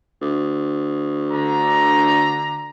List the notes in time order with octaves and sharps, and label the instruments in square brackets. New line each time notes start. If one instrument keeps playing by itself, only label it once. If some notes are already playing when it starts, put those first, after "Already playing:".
[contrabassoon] D2
[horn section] D3 A#5